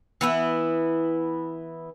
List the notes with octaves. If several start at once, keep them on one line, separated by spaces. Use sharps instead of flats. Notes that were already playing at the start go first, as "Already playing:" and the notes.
E3 B3 E4